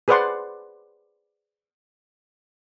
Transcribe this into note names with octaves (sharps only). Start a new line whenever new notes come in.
G#4 B4 C5 D5 F#5 C6